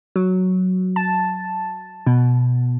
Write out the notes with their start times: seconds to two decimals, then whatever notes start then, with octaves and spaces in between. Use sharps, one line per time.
0.16 F#3
0.96 A5
2.07 B2